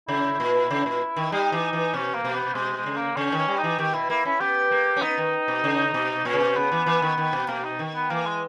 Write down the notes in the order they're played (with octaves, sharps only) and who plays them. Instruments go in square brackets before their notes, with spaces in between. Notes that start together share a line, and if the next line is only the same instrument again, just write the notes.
[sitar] C#3 [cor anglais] E4
[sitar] A#2
C#3
A#2
D#3
[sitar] G3 [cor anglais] D#4
[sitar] E3
E3
[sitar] B2 [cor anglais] C#4
[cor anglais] A#3
[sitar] B2
[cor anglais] B3
[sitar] B2 [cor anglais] G#3
[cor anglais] G#3
[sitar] C#3
[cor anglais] A#3
[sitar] C#3 [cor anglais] C#4
[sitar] D#3 [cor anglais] C#4
[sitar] G3
[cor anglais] D#4
[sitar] E3
[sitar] D#3 [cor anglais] G4
[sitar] B2 [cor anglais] E4
[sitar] A#3 [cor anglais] E4
[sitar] C#4 [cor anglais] E4
[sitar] B3 [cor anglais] G4
[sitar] A#3
C#4
[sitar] B3 [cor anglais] D#4
[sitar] D#3
B2
C#3
B2
[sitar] A#2 [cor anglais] C#4
[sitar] C#3
B2
[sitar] C#3 [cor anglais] B3
[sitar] E3
E3
D#3
D#3
B2
[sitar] B2 [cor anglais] A#3
[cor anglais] D#4
[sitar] D#3
[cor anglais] B3
[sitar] E3 [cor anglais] A#3
[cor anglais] G#3